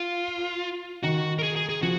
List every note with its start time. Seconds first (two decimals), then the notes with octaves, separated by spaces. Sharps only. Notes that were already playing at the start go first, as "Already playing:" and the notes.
Already playing: F4
1.03 D#3 F#4
1.39 A#4
1.43 G#4
1.56 G#4
1.69 G#4
1.82 F3 F#4